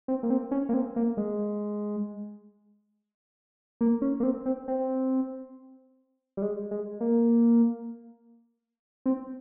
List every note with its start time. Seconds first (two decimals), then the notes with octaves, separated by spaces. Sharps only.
0.08 C4
0.23 A#3
0.30 C4
0.51 C#4
0.69 A#3
0.74 C4
0.96 A#3
1.17 G#3
3.81 A#3
4.02 C#4
4.20 A#3
4.23 C4
4.46 C4
4.68 C4
6.37 G3
6.42 G#3
6.71 G#3
7.01 A#3
9.06 C4